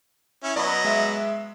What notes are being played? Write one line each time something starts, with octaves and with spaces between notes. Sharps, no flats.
C#4 E4
F#3 B3 D5 D#5 B5
G#3 E5